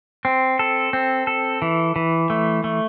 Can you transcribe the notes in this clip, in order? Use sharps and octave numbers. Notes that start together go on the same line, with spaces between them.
C4
A4
C4
A4
E3
E3
A3
A3